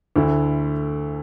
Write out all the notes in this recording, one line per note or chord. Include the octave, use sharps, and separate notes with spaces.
D2 D3 A3 E4